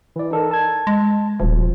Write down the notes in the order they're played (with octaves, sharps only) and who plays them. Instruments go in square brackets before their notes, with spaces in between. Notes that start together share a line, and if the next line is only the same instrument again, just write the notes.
[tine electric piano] E3 D5
D#4 A4 A#4
A5 G#6
[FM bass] G#3
[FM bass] D#1 [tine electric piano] B2 F3